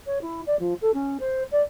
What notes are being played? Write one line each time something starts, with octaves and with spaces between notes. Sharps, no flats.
C#5
E4
D5
F3
A4
C#4
C5
D5